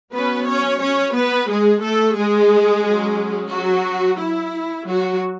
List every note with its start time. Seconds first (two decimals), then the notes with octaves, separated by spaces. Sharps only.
0.12 F#3 B3 C#4 B4
0.47 C#4 C#5
0.80 C#4 C#5
1.14 B3 B4
1.48 G#3 G#4
1.82 A3 A4
2.15 G#3 G#4
2.83 F#3 C#4
3.50 F#3 F#4
4.19 E4
4.86 F#3 F#4